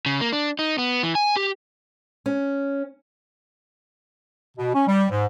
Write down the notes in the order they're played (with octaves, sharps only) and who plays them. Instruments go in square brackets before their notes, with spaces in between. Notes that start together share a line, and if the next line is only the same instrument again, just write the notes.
[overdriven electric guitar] C#3
A#3
D4
D#4
B3
E3
G#5
G4
[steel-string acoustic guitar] C#4
[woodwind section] B2
C#4
G3
G#2